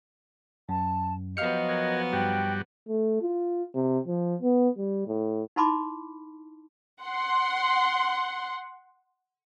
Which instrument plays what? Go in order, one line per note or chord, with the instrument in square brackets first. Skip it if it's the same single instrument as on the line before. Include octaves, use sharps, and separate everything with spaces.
[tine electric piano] F#2 [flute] A5
[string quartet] F3 F#3 B3 [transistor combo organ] G4 [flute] D#5 [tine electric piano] F5 F6 C#7
[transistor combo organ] F#4 A#4 G#5
[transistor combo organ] G2 G3 F#4 [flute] G5
[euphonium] A3
F4
C3
F3
B3
G3
A2
[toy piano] D#4 E4 A5 B5 C6 D6
[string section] F#5 C6